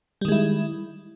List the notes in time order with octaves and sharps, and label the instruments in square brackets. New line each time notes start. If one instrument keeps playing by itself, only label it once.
[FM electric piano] G3
D#3
G#3
E4